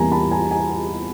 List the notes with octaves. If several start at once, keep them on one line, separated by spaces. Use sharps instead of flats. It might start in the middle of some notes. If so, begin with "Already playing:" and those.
Already playing: E2 C3 E3 G3 A#3 G#5 A#5
A5 B5
G#5 A#5
G#5 A#5